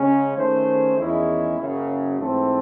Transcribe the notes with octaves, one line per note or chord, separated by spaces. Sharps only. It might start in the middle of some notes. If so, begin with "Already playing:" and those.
Already playing: C#3 G#3 C#4
D#3 A3 C#4 G#4 C5
E2 D#3 G#3 C#4 E4
F#1 F#2 C#3
G#2 E3 A3 C4